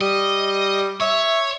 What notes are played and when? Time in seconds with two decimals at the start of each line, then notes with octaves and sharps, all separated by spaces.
0.01 G3 D#5
1.01 C#5 E5